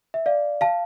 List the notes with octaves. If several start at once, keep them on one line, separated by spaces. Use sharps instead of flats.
E5
D5 F5
F5 A5